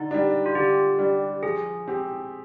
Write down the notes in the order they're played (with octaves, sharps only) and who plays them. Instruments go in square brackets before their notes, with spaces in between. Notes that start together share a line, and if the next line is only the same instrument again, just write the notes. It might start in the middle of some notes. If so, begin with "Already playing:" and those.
Already playing: [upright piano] D3 [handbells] D#4
[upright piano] G3 D4
[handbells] F4
[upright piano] D3 [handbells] G4
[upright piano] G3 D4
[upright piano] F3 [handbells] G#4
[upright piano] C4 G4